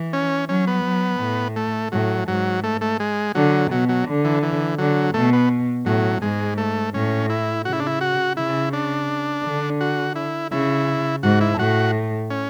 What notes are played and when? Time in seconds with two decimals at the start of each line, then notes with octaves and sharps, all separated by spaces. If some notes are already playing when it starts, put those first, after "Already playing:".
Already playing: E3
0.13 C#4
0.49 F#3 C#4
0.67 B3
0.84 F#3
1.20 A2
1.56 A3
1.92 A2 F#3
2.28 G#2 F#3
2.63 A3
2.81 A3
3.00 G#3
3.35 D3 F#3
3.71 B2 F#3
3.89 F#3
4.08 D3
4.25 E3
4.43 E3
4.78 D3 F#3
5.14 B2 A3
5.33 B3
5.86 A2 F#3
6.22 G#2 G#3
6.58 A3
6.94 A2 C#4
7.30 E4
7.65 C#3 F#4
7.73 E4
7.80 D4
7.87 E4
8.01 F#4
8.37 C#3 E4
8.73 D4
9.44 D3
9.81 F#4
10.15 E4
10.52 C#3 E4
11.23 G#2 F#4
11.41 E4
11.59 A2 F#4
12.30 C#4